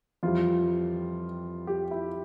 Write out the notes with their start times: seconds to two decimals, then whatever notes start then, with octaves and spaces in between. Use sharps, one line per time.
0.23 F2 E3 G3 F4
1.67 G4
1.91 E4